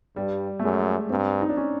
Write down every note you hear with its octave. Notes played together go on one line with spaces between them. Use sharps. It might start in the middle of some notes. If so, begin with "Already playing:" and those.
G2 G3
A3
F#2 G#3
G2 C4
D#4
D4
C#4